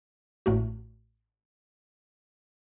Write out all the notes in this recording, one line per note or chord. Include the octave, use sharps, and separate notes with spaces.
A1 A2 A3 F#4